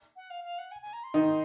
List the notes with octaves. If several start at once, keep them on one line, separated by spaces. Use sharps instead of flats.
F#5
F5
F5
F#5
G#5
G#5
A#5
C6
D#3 D#4